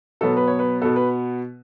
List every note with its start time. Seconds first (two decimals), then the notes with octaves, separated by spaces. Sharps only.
0.21 B2 F#3 B3 A4
0.37 B4
0.48 C#5
0.59 B4
0.82 B2 B3 A4
0.96 B4